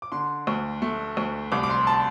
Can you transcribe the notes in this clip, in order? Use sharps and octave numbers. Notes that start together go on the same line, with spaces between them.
D6
D3 C6
D2
A3
D2
C2 D6
D6
C6
A5